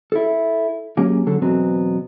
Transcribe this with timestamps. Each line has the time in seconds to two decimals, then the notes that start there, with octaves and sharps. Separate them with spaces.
0.12 E4 A4
0.97 F#3 A#3 C#4 G4 G#4
1.27 D3 F#3 A4
1.42 E2 B2 F#3 B3 C4